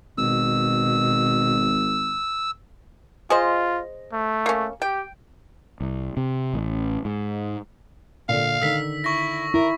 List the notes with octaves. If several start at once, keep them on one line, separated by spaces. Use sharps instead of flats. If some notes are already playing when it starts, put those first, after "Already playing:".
G#1 B2 E6
F4 G#4 C5 D#5
A3
A#3 C#4
G4 G5
C2
C3
A1
G#2
A#2 D3 F5
D3 D#3 E6 B6
E4 C#6 A#6
E4 A#4